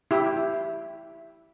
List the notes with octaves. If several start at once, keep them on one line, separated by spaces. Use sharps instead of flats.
E4 G4